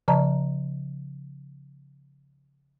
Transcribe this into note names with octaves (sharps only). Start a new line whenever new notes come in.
C#3 F3 D5 A5 A#5